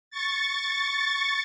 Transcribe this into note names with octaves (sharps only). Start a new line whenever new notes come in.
C#6 A6